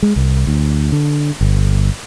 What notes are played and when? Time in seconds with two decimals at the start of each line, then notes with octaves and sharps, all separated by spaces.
0.02 G#3
0.16 C2
0.47 D2
0.92 D3
1.41 G1